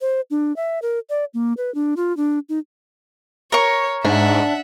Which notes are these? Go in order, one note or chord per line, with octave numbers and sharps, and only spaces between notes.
C5
D4
E5
A#4
D5
A#3
B4
D4
F4
D4
D#4
A#4 C#5 C#6
G#2 D4 E5 F#5